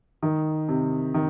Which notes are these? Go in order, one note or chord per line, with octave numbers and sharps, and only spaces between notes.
D#3
C3
D#3